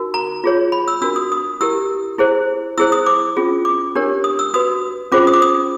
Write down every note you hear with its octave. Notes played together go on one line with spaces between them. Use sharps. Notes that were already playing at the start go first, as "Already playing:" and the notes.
Already playing: D#4 F#4 A#4
A#5
F4 G#4 C#5
B5
E6
D4 F#4 A#4 E6
D#6
D#6
E4 G4 A#4 E6
E4 G#4 C5
E4 G#4 C5 E6
D#6
D6
C#4 F4 G#4
D6
D4 G4 A#4 C#5
D#6
E6
F#4 B4 D#6
C#4 F4 G#4 C5 D6
D#6
D6
D#6